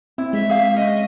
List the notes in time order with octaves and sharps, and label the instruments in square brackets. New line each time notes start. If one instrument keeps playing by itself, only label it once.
[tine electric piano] C4 [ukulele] E4
[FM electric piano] G#3 [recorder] E5
[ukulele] G#4 F5
[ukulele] C#4 [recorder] D#5